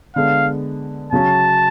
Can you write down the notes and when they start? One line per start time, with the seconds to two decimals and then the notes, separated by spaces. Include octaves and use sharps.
0.15 D3 G#3 B3 D4 F5
1.12 C#3 F#3 C#4 A5